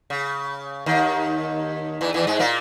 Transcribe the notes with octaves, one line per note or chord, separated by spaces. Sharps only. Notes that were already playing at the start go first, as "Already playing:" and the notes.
C#3
D#2 D#3
E2 E3
E2 E3
G#2 G#3
A#2 A#3